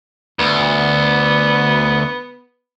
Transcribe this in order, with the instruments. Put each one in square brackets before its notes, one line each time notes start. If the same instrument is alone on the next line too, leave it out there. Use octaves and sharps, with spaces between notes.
[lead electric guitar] D2 [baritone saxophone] B3